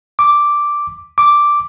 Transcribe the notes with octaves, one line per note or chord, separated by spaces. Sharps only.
D6
D6